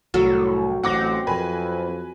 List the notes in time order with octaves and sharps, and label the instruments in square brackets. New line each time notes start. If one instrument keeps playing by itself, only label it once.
[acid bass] C2 [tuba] A2 [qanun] F#3 A4
[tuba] A1 [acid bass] C4 [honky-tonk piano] F#5 D6 A#6
[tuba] F2 [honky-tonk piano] B4 G#5 B5